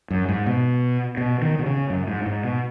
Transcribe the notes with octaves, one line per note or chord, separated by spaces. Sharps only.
F#2
G#2
B2
B2
D#3
B2
C#3
F#2
G#2
G#2
B2